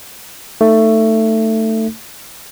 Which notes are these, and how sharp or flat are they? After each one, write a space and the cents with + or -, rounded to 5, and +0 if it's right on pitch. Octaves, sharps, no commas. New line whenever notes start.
A3 +15 D#4 -5